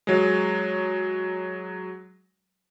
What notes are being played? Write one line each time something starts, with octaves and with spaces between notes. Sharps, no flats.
F#3 G#3